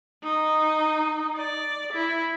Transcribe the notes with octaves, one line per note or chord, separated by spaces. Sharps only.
D#4
D5
E4